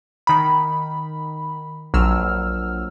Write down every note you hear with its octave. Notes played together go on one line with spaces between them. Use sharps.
D#3 B5
A#1 F#3 E6 F6